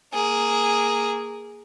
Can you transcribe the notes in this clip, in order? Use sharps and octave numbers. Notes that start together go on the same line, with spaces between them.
A#3 G#4